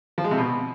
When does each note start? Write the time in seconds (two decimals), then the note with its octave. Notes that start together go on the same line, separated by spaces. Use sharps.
0.18 F3
0.24 G#3
0.31 C3
0.38 B2